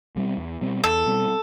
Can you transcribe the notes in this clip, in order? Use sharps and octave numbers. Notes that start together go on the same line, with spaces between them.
B2 G3 C4
E2
B2 G3 C4
E2 A4
B2 G3 C4